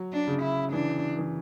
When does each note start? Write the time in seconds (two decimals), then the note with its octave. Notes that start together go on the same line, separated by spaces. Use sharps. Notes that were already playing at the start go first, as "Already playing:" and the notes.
Already playing: F#3
0.12 D4
0.27 C#3
0.42 E4
0.72 E3 D4
1.19 E3